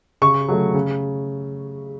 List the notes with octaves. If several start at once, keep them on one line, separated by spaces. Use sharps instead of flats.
C#3 C#6
F#3 A3
C#3